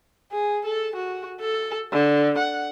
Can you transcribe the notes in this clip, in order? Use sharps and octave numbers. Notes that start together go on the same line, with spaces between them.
G#4
A4
F#4
A4
D3
F#5